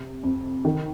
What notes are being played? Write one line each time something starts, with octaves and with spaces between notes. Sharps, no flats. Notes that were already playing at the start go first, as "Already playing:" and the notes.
Already playing: C3
F2
D#3